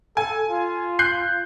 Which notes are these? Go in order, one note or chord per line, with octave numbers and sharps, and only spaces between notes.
A4 G#5
F4
F#6 G6 C7